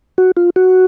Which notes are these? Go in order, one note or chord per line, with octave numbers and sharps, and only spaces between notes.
F#4
F4
F#4